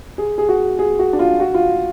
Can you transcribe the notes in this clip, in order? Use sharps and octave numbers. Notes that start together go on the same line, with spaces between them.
G#4
G#4
F#4
G#4
F#4
D4
F4
F#4
F4